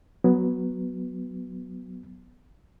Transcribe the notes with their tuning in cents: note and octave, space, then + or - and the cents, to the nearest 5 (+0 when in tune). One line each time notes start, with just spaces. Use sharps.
F#3 +0 B3 +0